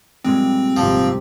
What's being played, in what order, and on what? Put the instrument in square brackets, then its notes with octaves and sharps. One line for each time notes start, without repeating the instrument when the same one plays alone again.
[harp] A#2 G3 G#3 [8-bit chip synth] C4
[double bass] G#1 C3 [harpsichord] F3